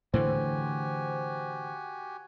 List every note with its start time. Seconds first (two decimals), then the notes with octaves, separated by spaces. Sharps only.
0.14 A2 D3 E3 F#4 G4 C5 G#5